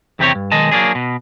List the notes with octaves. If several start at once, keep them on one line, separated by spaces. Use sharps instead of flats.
E2 C3 C4 G4 C#5
G2
B1 D#3 G#3 D#5 A5
F#3 A#3 D4 G#4
B2